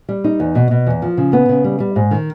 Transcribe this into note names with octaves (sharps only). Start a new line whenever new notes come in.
G3
D#4
E2
B2
B2
E2
F3
C#3
B3
C#3
G3
G3
G#2
D#3